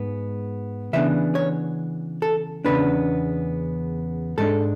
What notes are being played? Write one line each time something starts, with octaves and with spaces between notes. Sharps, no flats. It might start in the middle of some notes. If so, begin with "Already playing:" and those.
Already playing: G#2 G#3 B3
C#3 E3 B3 D4 E5
C#5
A4
E2 C#3 E3 B3 D4 B4
G#2 G#3 D4 A4